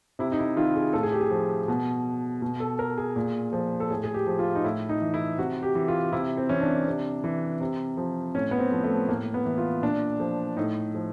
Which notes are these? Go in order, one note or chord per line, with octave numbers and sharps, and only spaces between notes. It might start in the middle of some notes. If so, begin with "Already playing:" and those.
C3 E4
D#4
E4
D#3 F4
G#4
A2 A4
G#4
G4
G#4
F3
B2
B2
A4
A#4
G#4
A#2
F3
A4
A2 G#4
G#4
G4
F3
F4
D#4
A2 E4
D#4
E3
E4
C3 F#4
G4
E3
F4
C3 E4
C4
E3 C#4
D4
C3
E3
C3
F3
A2 C#4
B3
C4
F3
A3
A2 A#3
B3
E3
F4
A#2 D4
F3
A2 D#4
F3